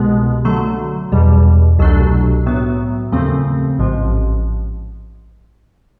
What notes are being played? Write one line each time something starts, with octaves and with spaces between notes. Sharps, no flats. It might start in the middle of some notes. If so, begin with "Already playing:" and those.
Already playing: C2 B2 G#3 B3
D3 F#3 A3
E2 B2 G3
C2 B2 F#3 A3 D4
A2 F#3 B3
D#2 C#3 F3 A3 C4
A1 G#2 F3